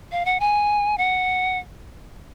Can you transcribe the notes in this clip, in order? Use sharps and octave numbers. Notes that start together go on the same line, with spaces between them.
F5
F#5
G#5
F#5